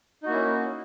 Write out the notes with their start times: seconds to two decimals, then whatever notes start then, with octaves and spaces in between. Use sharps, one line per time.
0.23 D#4
0.26 F#4
0.28 A#3
0.31 E4
0.34 C#4